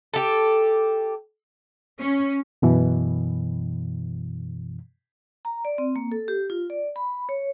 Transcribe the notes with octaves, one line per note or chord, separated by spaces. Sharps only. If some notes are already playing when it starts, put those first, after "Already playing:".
G4 A4
C#4
F#2 B2 E3
A#5
D5
C4
A#3
A4
G4
F4
D5
B5
C#5